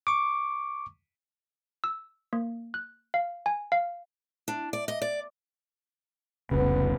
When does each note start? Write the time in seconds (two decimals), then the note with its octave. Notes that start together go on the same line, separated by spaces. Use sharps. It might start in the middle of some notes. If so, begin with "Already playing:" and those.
0.07 C#6 D6
1.84 E6
2.33 A#3
2.74 F#6
3.14 F5
3.46 G#5
3.72 F5
4.48 D4
4.73 D5
4.88 D#5
5.02 D5
6.51 F1 C2 C#3 B3